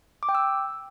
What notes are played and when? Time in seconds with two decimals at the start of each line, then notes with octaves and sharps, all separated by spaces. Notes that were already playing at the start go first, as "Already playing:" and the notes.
0.23 D6
0.29 G5
0.35 E6